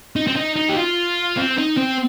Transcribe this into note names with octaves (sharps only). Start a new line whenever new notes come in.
D#4
C4
D#4
D#4
G4
F4
C4
D#4
C4